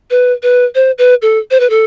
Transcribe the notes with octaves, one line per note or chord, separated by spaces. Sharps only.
B4
B4
C5
B4
A4
C5
B4
A4